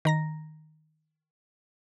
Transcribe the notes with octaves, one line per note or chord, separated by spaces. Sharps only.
D#3 A#5 A#6